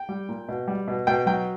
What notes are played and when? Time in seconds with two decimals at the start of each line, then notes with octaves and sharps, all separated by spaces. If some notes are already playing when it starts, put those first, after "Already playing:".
Already playing: G5
0.09 G3
0.29 A#2
0.49 B2
0.68 G3
0.88 B2
1.07 B2 G5
1.26 F#3 G5